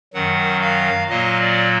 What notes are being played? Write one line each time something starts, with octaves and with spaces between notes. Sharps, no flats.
F#2 D#3 F#3 F#5
F5
A#2 F#3 A#3 D#5
D5